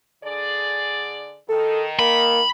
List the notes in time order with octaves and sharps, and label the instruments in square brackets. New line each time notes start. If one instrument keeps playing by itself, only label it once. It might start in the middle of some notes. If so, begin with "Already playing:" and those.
[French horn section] D3 G#4 D5
[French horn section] D#3 [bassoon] A4
[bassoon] A#3 [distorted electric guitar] B5